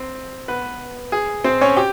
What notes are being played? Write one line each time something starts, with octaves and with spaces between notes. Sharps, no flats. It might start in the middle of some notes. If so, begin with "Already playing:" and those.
Already playing: C4 C5
B3 B4
G#4
C4 C5
C#4 C#5
G4 G5